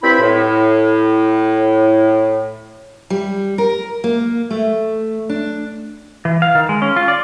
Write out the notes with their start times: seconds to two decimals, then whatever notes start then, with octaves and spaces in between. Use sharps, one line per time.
0.03 G2 C4 E4 B5
0.21 A2
3.10 G3
3.58 A#4
4.04 A#3
4.51 A3
5.29 D4
6.25 E3
6.42 F5
6.55 D#3
6.69 G#3
6.82 C#4
6.96 F4
7.08 D5